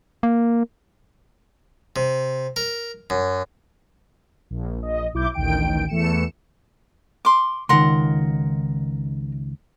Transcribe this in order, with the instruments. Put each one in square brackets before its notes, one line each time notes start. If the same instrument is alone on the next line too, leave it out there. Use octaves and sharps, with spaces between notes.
[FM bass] A#3
[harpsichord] C3
A#4
F#2
[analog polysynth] A#1
A#1 D#5
B1 E4 D6 G6
A1 D2 D#3 G5 D7
E2 E3 A3 C#7 E7
[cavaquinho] C6 D6
[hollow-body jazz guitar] C#2 D#3 [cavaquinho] A#4 F#5 C6